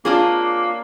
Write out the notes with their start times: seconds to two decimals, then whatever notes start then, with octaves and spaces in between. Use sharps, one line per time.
0.05 A#3 C4 D4 F4 G#4 C#5